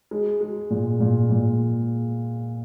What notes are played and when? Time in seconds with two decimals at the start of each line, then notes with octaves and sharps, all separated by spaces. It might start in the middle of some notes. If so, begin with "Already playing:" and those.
0.11 G#3
0.41 G#3
0.70 A#2
1.00 A#2
1.30 A#2